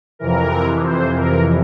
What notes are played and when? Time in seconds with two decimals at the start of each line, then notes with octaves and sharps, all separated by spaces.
0.19 F2 C3 E3 A#4
0.84 C5
1.16 A#4